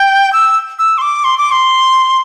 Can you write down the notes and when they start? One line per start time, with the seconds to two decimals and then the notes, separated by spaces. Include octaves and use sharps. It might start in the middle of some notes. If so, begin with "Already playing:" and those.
Already playing: G5
0.33 E6
0.79 E6
0.98 C6
1.02 D6
1.24 C6
1.38 D6
1.51 C6